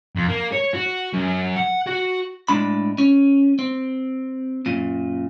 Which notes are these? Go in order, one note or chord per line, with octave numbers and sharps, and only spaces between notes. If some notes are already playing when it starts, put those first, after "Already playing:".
F2
A#3
C#5
F#4
F#2
F#5
F#4
A2 G#3 D4 B5
C#4
C4
F#2 A#2